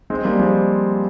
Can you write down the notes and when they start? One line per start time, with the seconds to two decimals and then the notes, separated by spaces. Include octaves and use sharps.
0.10 G#3 C4
0.25 G3 A#3
0.39 F3 G#3